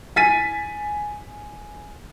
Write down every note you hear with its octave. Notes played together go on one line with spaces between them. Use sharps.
G#5 A6 B6 D#7